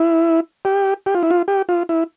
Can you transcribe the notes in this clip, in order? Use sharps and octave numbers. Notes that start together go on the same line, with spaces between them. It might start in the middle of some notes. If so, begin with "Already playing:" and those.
Already playing: E4
G4
G4
F4
E4
F4
G4
F4
E4